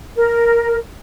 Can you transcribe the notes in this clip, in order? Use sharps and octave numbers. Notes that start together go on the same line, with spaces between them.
A#4